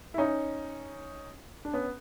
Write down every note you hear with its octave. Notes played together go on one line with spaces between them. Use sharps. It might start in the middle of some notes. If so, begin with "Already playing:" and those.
E4
C#4 D#4
D4
B3 C#4